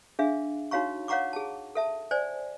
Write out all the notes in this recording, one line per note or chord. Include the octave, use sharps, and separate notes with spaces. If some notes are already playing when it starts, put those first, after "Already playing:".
D4 G#4 E5 F5
D#4 F#4 C#5 F5 A#5 C#6
C#5 F5 F#5 A#5 C#6 D6
G#4 A5
A4 E5 A5
C5 D5 G#5